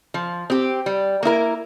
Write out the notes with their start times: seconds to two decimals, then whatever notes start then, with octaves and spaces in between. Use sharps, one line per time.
0.14 F3
0.50 C4 G4
0.86 G3
1.23 A#3 E4 A#4